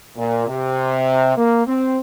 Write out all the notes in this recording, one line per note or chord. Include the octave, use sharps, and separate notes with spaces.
A#2
C3
A#3
C4